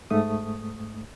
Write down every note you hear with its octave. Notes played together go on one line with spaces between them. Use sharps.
G#2 A3 D#6